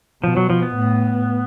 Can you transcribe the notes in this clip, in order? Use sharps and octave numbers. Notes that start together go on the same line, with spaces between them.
B2 F3
F#3
F3
B3
A2